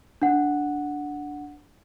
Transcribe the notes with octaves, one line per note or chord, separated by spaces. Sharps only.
D4 F#5